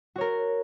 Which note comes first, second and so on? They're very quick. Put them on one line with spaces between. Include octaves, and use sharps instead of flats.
F#4 C#5 A#4